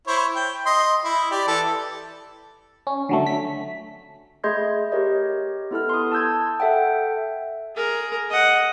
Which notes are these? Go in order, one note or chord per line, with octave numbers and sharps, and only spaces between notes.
E4 C5 C#5
G5
D#5 C6
E4
G4 D5
E3 A4
C#4
D3 F#3 A3
B6
A3 G#4 D#5 C6 G6 G#6
G4 A#4 C#5 D#5
B3 E4 A4 F6
C6 D#6
A5 E6 G6 G#6
A4 E5 F#5 G5
G#4 A#4
D#5 F#5